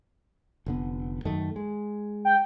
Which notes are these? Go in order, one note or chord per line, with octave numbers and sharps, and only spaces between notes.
F1 D3 B3
F#2 D#3 A3
G#3
G5